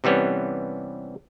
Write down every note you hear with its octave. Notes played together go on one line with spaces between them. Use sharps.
C3 E3 G3 B3 C#4